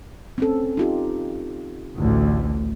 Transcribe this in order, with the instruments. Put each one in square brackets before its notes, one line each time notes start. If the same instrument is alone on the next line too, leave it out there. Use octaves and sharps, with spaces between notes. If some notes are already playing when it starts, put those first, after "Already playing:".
[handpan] C4 C#4 A4
D#4 F4 G4
[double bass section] A1 D2